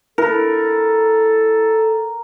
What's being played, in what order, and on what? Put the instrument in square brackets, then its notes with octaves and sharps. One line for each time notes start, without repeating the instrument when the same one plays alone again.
[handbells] E4 [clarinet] A4 [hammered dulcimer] A#4